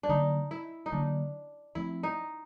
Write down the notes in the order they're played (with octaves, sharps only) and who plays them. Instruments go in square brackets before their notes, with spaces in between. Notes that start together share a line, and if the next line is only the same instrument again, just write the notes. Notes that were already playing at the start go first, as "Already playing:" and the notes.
[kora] D4
[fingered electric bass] D3 F#3 A#3 [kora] D#4
[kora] E4
D#4
[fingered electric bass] D3 F#3 A#3 [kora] D4
[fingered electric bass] F3 A3 C4 [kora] E4
[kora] D#4